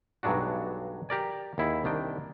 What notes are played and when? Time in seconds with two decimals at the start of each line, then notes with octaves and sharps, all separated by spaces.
0.23 B1 G2 F#3 G#3 D4 F#4
1.09 G4 A#4 D5 G#5
1.58 D#2 E4 G#4
1.84 C2 D#3 D4 G5